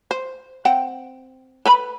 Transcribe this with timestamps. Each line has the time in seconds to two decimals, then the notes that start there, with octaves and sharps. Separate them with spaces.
0.11 C5
0.65 C4 F#5 G5
1.66 A4 B4 B5